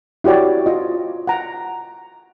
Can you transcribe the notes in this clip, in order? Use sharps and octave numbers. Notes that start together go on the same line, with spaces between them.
E4 F#4 G4 C#5 D5
F4 D#5
F#5 A#5